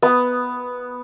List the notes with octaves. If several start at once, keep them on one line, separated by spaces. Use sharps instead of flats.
B3